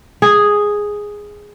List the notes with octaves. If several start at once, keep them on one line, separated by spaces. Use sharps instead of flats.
G#4